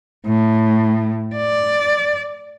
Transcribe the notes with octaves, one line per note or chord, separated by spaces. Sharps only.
A2
D5